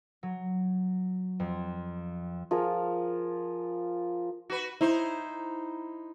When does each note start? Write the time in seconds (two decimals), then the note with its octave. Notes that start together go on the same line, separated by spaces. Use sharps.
0.23 F#3
1.40 F2
2.51 F3 F4 G#4 A#4
4.50 F#4 B4
4.81 D#4 E4 C5